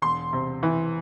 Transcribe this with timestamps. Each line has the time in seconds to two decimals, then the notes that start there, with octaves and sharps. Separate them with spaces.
0.02 E1 C6
0.33 C3
0.63 E3